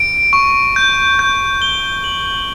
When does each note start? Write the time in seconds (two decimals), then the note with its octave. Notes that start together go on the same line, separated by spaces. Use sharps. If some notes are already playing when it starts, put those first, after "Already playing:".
Already playing: D7
0.33 C#6
0.76 G6
1.19 G6
1.62 G7
2.04 F#7